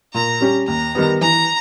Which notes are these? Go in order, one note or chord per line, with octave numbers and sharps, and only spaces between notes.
A#2 A#5
G3 C#4 G4
D#2 A#5
D#3 G3 B3
E3 A#5